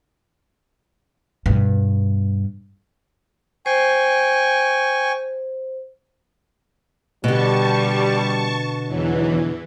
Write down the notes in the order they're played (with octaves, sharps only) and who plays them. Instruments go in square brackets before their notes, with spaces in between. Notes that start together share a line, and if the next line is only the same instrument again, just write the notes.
[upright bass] G2 B2
[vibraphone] C5 [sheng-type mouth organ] G5 G#5 C#6
[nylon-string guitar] B2 D3 [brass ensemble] G3 [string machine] A5 C#6
[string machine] E2 E3 [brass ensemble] G#2 F#3